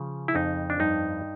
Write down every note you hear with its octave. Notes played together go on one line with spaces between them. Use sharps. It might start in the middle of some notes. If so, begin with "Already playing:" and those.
Already playing: C#3 F3
E4
F2 D#4
D4
G2 D#4